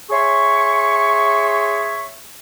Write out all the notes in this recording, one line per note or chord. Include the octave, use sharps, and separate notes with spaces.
G#4 C#5 E5 C6 C#6